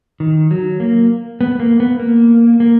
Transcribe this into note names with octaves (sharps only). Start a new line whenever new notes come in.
D#3
F#3
A#3
B3
A#3
B3
A#3
A#3